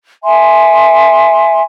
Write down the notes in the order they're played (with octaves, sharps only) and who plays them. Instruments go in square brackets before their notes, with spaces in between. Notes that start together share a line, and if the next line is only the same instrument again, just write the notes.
[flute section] E5 G#5 C6